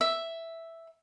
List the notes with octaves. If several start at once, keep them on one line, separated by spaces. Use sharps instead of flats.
E5